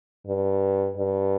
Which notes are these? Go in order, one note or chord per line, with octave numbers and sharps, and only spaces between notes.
G2
G2